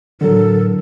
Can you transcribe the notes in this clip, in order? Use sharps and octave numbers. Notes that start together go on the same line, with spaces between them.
A2 D3 F#3 A4 A#4